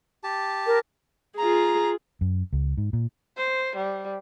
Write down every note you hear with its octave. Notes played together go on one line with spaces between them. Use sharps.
G4 A5
A#4
F4 G#4 A#5
F#2
C#2
G#2
A#2
C5
G3